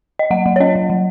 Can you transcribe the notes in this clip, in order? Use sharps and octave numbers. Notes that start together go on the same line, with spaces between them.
D#5
F#3 F#5
F#3
C#5
C#4 D#5
F#3
F#3